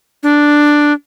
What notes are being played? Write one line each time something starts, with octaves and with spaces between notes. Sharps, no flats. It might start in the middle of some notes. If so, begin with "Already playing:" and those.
D4